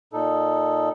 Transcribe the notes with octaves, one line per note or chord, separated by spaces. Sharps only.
A#2 D#4 A4